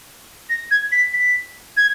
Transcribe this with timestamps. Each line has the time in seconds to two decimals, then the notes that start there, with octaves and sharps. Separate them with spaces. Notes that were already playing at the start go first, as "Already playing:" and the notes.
0.49 A#6
0.71 G#6
0.92 B6
1.13 B6
1.77 G#6